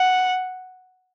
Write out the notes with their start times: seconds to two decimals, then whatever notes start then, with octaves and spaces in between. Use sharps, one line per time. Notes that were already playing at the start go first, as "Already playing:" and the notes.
Already playing: F#5